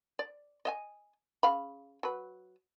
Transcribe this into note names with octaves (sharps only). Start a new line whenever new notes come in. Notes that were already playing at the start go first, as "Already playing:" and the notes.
D5
D#5 E5 G#5
C#3 F5 B5
F#3 B4